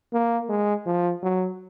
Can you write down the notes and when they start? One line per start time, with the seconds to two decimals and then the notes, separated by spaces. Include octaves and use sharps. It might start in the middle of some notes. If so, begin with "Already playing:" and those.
0.13 A#3
0.49 G#3
0.86 F3
1.23 F#3